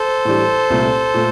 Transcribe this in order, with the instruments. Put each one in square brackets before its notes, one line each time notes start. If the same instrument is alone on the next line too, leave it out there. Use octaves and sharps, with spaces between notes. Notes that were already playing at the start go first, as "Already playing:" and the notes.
Already playing: [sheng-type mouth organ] A4 C5
[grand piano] A2 E3 G3 D4
C2 A#2 A3
A#2 A3